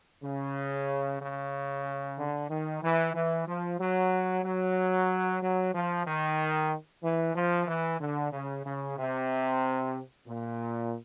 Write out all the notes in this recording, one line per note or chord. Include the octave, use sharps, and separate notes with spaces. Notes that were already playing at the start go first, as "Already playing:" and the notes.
C#3
C#3
D3
D#3
E3
E3
F3
F#3
F#3
F#3
F3
D#3
E3
F3
E3
D3
C#3
C#3
C3
A#2